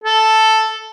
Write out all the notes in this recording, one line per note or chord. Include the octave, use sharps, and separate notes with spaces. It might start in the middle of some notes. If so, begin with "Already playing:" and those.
A4